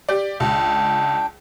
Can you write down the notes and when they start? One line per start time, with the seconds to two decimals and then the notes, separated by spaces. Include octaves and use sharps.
0.09 G4 D5
0.40 C#2 D4 G5